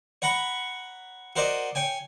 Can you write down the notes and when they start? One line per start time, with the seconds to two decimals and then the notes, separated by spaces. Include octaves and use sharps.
0.22 C#5 F#5 A#5 B5 C#6
1.36 F#4 A#4 C5 D5 D#5
1.75 C#5 G5 G#5